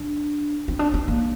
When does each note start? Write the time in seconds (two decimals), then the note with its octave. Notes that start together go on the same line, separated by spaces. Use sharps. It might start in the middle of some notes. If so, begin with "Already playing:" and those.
Already playing: D4
0.68 C4
0.79 D4
0.94 C4
1.08 A#3